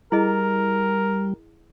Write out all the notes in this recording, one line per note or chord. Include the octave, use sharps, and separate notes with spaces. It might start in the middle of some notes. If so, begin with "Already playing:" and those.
G3 E4 G#4 A#4 D#5